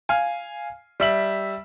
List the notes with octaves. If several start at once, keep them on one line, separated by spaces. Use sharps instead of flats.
F5 G#5
G3 E5 F#7